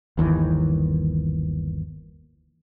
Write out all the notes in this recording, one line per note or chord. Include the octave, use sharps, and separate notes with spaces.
G1 D#2 D#3 E3